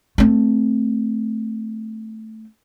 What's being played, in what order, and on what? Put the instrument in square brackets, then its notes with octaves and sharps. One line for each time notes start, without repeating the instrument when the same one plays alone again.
[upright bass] A3 C4